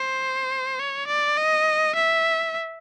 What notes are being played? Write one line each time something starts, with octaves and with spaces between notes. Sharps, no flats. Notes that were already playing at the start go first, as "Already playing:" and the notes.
Already playing: C5
C#5
D5
D#5
E5